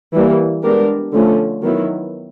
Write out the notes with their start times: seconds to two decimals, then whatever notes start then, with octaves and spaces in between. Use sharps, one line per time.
0.13 E3 G3 A#3
0.63 G#3 B3 D4 G4 A#4
1.13 D3 F3 A3 C#4
1.63 D#3 F#3 B3 E4